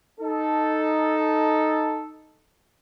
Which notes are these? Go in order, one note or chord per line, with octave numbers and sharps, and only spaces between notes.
D#4 A4